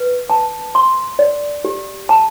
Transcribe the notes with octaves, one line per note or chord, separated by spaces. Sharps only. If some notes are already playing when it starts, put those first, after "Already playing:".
Already playing: B4
A5
C6
D5
G4
A5